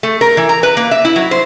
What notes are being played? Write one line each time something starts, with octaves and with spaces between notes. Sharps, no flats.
A3
A#4
E3
A#5
B4
A#3
E5
E4
F#3
C5